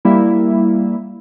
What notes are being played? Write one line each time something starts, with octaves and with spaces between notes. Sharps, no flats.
G3 A#3 E4